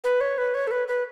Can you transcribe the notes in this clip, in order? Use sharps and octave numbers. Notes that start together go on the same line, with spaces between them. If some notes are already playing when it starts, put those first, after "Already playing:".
B4
C#5
B4
C#5
A4
B4
B4